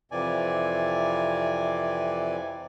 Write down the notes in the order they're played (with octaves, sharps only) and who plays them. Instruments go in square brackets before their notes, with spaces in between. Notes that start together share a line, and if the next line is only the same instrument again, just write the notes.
[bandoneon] F2 C3 E3 D5 G#5